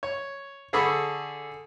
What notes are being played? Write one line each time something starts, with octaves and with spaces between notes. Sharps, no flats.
C#5
D3 G#4 A4 B5 C#6